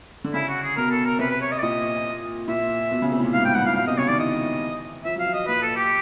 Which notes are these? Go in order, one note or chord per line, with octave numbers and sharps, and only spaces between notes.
D3
C#3 E4
F#4
G#4
B2 A#4
A4
A#4
C3 B4
B4
C#5
D#5
D5
A#2 D#5
A#2 E5
B2
C#3
C3
A2
A#2
G#2 F5
A2 G5
G2 F#5
A#2 F5
B2 F5
C3 D#5
C#3 C#5
D#3 D5
E3 D#5
F3 E5
F#3 F5
F3
D#5
A#2 B4
A4
G4